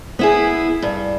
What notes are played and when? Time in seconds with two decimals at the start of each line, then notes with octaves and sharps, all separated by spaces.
0.19 B3 E4 G#4
0.82 G2